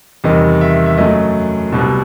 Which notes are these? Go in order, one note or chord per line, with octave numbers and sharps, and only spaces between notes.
E2 C3 D#3 G3 D#5
E5
E5
F#2 F#3 A3 D#5
C2 B2 G3